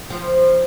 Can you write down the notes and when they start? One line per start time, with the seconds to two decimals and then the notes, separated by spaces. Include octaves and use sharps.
0.10 F3